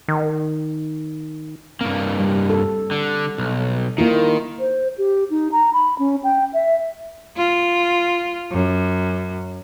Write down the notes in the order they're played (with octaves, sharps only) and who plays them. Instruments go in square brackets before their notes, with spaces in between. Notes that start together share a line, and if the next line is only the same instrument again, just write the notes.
[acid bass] D#3
[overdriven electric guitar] G2 A#3 [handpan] C4
[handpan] G3
A4
[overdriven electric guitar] D3
B1
[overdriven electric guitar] D#3 [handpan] A#3 E4 F4
[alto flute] C5
G4
D#4
A#5
B5
C#4
G5
E5
[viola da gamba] F4
F#2